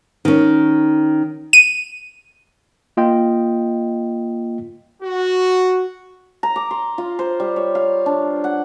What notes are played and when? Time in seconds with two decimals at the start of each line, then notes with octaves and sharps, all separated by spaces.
0.25 D#3 C#4
1.53 D#7
2.97 A#3 F4 D#5 G5
5.02 F#4
6.43 A#5
6.56 D6
6.71 C6
6.98 F4
7.19 C5
7.40 G3
7.56 C#5
7.75 F5
8.06 D4
8.44 F#5